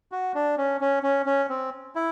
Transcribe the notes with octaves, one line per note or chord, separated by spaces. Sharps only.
F#4
D4
C#4
C#4
C#4
C#4
C4
E4